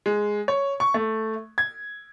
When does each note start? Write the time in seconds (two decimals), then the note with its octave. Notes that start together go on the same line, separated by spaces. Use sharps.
0.06 G#3
0.48 C#5
0.80 C#6
0.94 A3
1.58 G#6